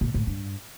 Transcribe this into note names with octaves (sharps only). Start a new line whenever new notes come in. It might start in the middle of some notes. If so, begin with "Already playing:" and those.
A#2
A2
G2